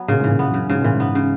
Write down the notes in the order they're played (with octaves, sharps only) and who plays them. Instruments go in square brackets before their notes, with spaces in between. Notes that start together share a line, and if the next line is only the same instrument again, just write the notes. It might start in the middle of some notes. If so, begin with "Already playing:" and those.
Already playing: [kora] F#3 B3
[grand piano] A#2 [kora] C#3
[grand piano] G#2
[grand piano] A#2 [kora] E3
[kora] B3
[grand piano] F#2 [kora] C#3
[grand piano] G#2 [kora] C#3
[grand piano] A#2 [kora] E3
[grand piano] G#2
[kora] B3
C#3